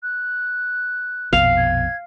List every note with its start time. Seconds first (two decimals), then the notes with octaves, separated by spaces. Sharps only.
0.03 F#6
1.33 A#1 F2 B2 F5
1.57 G#6